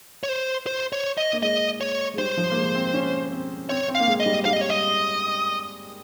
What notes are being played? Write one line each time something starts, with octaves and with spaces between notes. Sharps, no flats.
C#5
C5
C5
C#5
D#5
A#3
G#3 D#5
C#5
G#3
G3 C5
F3
A#3
G#3
C4
C#4
C4
C4 C#5
C4
A#3 F5
G#3
D#5
G3
G3 F5
D#5
C#5
D#5